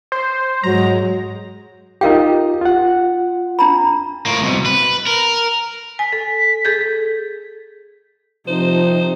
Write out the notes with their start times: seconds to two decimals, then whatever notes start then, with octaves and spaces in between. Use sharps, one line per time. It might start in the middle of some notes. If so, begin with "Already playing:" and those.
0.12 C5
0.64 G#2 F#3 G#3 A#5
2.01 D#4 F4 G4 A#4 F5 G5
2.61 F4 F#5
3.59 D4 A#5 B5
4.26 A2 A#3
4.42 C2 B2
4.66 B4
5.07 A#4
5.99 G#5 B6
6.12 A4
6.65 G#4 A4 G6
8.47 C3 F3 D#4 C5